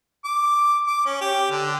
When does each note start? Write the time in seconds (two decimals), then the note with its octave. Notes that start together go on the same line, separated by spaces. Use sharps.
0.25 D6
0.87 D6
1.06 C#4
1.21 G4
1.51 D3